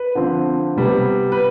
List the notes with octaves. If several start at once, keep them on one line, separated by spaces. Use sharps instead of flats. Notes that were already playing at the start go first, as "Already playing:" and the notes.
Already playing: B4
D3 F3 C4
C3 G3 B3
B4